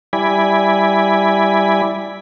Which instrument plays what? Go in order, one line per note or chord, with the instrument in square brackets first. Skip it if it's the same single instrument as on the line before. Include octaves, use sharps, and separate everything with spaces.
[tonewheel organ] G3 E4 D5 G#5 B5